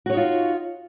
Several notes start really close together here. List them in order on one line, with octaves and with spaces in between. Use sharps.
F#4 C#5 D#4 F4